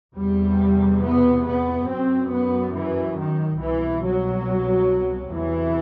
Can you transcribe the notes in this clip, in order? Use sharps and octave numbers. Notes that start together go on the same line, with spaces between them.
E2 C3 G3
B3
B3
F#2 C4
B3
E3
D#3
C2 B2 E3
F#3
E2 C3 E3